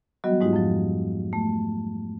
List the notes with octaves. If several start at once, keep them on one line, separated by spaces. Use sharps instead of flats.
E3 F#3 G3 B3 F#4 D#5
G#2 G#3 D#4 F4 G4
F2 F3
A3